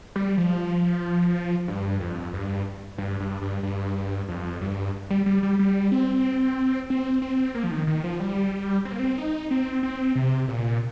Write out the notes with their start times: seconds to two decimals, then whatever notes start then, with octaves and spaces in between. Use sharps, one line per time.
0.16 G3
0.38 F3
1.68 G2
2.00 F2
2.33 G2
2.98 G2
3.20 G2
3.42 G2
3.63 G2
4.29 F2
4.61 G2
5.10 G3
5.26 G3
5.43 G3
5.59 G3
5.92 C4
6.90 C4
7.22 C4
7.55 A#3
7.63 F3
7.71 D#3
7.87 D#3
8.04 F3
8.20 G3
8.85 C4
8.92 A#3
8.99 C4
9.18 D#4
9.51 C4
9.83 C4
10.15 C3
10.48 A#2